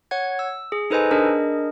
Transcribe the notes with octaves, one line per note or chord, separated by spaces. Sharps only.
C#5 F#5 G#6
E6
G#4
D#4 A4 B4 C5 D#5 G#5
D4 G#4 A#4 D#5